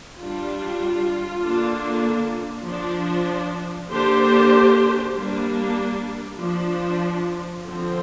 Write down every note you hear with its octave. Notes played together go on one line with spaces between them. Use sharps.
G3 D4 F4
D3 A#3 D4
F3 D4
D3 A#3 D4 G4 C5
G3 A#3 D4
F3 D4
D3 F3 C4